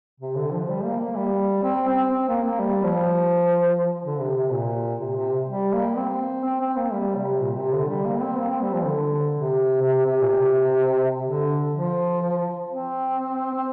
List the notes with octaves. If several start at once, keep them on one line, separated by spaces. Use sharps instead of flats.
C3
D3
F3
G3
A#3
A#3
G3
C4
C4
C4
A#3
A#3
G3
F3
D3
C3
C3
A#2
C3
C3
G3
A#3
C4
C4
C4
A#3
G3
C3
A#2
C3
D3
G3
A#3
C4
A#3
C4
G3
F3
D3
C3
C3
C3
A#2
C3
D3
F3
C4
C4